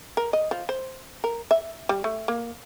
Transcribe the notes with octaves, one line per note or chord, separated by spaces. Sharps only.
A#4
D#5
F3
C5
A#4
E5
G3
A3
A#3